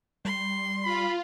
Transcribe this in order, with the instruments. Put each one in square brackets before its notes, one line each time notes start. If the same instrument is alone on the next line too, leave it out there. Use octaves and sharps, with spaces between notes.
[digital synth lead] G3 [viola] C6
[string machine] F4 [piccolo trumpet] B5